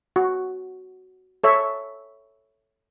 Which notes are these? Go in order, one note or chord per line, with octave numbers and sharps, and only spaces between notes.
F#4
A4 C#5 E5